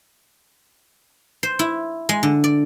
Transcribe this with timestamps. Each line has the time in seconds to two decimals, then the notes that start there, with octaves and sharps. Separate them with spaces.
1.43 C5
1.59 E4
2.09 G#3
2.23 D3
2.44 D5